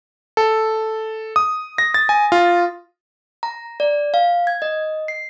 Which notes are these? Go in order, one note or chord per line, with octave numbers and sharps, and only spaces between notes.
A4
D#6
A#6
A6
G#5
F4
A#5
D5
F5
G#6
D#5
C7